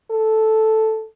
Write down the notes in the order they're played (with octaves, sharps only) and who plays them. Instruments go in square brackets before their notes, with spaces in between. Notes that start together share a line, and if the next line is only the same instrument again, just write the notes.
[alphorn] A4